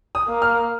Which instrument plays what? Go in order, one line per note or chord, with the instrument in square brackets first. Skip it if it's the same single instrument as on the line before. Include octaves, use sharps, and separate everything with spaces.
[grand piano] D#6
[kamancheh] A#3
[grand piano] F6